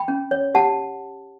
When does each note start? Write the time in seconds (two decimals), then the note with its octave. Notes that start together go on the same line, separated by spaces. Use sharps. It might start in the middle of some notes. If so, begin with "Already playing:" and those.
Already playing: G5 B5
0.08 C#4
0.31 C#5
0.55 G4 F#5 A5